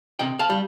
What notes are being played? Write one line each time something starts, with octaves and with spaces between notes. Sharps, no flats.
C3 D#5 G5
F5 A5
G3